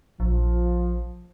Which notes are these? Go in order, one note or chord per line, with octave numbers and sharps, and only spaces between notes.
A#1 F3